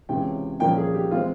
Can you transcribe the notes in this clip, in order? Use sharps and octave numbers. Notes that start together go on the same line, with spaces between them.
C#2 C3 E3 G#3 C#4 G5
C2 A#2 F3 A#3 C#4 G5
G#4
G4
E3 G#3 C4 F4